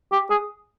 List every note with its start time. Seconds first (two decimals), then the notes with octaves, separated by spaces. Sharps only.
0.12 G4
0.30 G#4